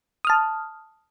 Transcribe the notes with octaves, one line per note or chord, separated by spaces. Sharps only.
A5 D#6 F6